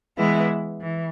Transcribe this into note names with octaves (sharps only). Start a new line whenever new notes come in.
E3 G#3 B3 E4
E3